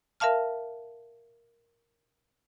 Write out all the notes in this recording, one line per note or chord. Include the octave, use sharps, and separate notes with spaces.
A#4 E5 F5 A5 F6